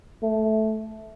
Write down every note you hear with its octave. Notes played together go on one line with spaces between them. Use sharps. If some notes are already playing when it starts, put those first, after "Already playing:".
A3